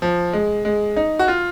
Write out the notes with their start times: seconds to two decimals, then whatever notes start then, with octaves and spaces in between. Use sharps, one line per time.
0.02 F3
0.33 G#3
0.65 G#3
0.96 D#4
1.19 F#4
1.28 F4